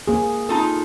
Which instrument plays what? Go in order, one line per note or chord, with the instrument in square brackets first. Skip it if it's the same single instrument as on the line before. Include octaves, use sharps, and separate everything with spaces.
[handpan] A#3 G#4
[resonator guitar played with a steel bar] D#4 F4 A4